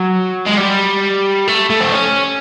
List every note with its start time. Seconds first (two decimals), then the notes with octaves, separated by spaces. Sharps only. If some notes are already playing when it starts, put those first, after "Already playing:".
Already playing: F#3
0.46 G#3
0.57 G3
1.48 A3
1.70 A3
1.80 C4
1.92 C#4